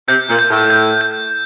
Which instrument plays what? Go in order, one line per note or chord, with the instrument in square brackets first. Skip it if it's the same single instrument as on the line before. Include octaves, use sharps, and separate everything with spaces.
[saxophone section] C3 [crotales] G6
[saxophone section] A#2
[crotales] G6
[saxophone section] A2
[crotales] G6
G6